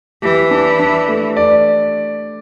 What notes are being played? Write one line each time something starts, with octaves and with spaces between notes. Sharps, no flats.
E3 G4
D4
D4
A3
D5